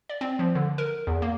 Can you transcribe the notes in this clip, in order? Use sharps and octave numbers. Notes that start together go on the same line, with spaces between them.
D5
C4
F3
D3
A#4
E2
A#3